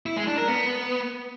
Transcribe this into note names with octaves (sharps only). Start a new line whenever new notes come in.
E4
G#3
D4
A#4
B3